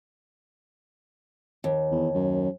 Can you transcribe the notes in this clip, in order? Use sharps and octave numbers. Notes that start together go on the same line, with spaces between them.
D#2
E2
F#2